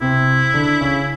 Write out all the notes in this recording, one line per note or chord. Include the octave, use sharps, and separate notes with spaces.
C3 C4 E4
D3 D4
C#3 C#4